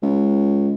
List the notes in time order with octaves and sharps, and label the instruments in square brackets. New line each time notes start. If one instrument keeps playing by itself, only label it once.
[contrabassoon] C#2